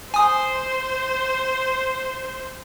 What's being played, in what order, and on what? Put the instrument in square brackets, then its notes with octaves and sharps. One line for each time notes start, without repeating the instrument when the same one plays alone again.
[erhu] C5 [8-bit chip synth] G#5 D#6